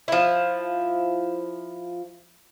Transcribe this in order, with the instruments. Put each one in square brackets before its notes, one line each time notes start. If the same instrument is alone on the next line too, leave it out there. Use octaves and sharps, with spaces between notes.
[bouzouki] F3 E4